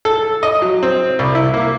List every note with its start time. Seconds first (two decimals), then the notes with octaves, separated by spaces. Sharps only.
0.05 A4
0.43 D#5
0.62 F#3
0.83 C4
1.19 C2
1.35 E4
1.54 A#3